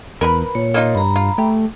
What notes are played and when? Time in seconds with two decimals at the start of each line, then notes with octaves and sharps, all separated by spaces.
0.21 E2 A#4 B4 B5
0.55 A#2 C#5
0.74 A#3 D#4 F4
0.95 G2 A#5 B5
1.16 F4
1.38 A3 G4